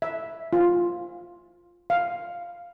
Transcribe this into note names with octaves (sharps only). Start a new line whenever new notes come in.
E5
F4
F5